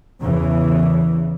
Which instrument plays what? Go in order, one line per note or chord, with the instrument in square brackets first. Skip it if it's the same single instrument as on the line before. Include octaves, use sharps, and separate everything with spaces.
[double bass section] E2 C#3 E3